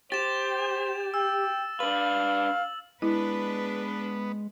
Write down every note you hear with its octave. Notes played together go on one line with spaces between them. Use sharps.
G4 C5 A6 E7
G5 E6
D4 B4 F5 F#7
G#3 B3 D4 E4 B4